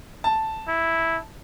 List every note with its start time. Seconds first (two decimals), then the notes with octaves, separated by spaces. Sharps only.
0.24 A5
0.68 E4